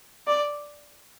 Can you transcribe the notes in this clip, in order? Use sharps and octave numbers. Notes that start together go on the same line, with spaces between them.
D5